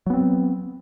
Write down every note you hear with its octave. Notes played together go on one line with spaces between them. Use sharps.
F#3 B3 C4